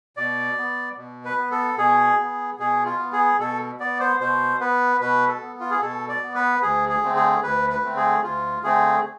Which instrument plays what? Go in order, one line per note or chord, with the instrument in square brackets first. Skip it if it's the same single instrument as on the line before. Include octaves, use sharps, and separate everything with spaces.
[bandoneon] B2 D5
B3
B2
B4
B3
A4
B2 G#4
B3
B2 G#4
F4
B3
G#4
B2 A4
B3 D5
C5
B2 C5
B3 B4
B2 B4
A4
B3
F4
G#4
B2 A4
D5
B3
B4
D2 G#4
G#4
D3 A3 C4
G#4
D2 B4
B4
D3 A3 C4
G#4
D2 F4
D3 A3 C4 G#4